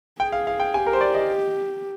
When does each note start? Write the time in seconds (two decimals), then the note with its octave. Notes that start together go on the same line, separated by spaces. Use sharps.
0.20 G#4 G5
0.32 F5
0.47 F5
0.60 G5
0.74 G4 G#5
0.86 A#4
0.93 C5
1.01 D5
1.15 D#5